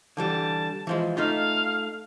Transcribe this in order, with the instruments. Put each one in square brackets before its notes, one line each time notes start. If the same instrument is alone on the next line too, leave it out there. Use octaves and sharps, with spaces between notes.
[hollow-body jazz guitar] D3 E3 G3 [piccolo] A5
[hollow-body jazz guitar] E3 F3 G#3
[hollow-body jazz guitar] A3 D#4 F4 [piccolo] F5